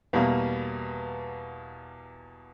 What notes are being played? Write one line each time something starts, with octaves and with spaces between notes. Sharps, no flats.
E2 B2 G3 A#3